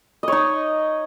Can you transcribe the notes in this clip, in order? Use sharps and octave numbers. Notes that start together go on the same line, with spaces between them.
D#4 C#5 D#5